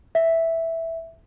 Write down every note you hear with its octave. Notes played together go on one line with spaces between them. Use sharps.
E5